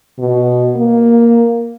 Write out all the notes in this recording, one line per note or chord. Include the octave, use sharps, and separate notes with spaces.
B2
A#3